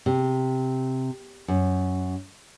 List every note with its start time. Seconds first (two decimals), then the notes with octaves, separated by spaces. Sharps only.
0.06 C3
1.48 F#2